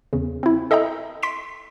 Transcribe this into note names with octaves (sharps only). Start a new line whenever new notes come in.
E2 C#3
C4 E4
A4 D#5 E5 G5 A#5
C6 B6 D7 E7